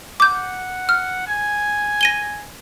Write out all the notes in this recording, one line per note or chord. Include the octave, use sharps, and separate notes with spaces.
F#5 D6 G6
F6
G#5
A#6 D#7 G7